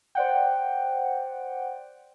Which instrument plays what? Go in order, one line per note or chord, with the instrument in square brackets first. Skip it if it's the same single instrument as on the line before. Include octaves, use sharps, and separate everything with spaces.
[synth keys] C5 D5 F#5 G5